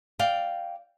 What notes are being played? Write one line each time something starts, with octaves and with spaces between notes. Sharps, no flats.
D5 F5 G5